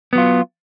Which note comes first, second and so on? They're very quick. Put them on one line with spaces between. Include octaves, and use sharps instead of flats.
B3 F#3 F4